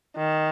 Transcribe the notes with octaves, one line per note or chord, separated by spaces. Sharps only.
D#3